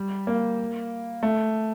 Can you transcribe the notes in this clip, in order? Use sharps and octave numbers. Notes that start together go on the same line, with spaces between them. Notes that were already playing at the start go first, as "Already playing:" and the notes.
Already playing: G3
A#3
A3